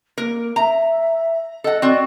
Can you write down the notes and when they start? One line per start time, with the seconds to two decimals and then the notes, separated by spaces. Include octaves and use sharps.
0.18 A#3 A#4
0.56 E5 A#5
1.64 A4 D#5 F#5
1.82 C4 F#4 D5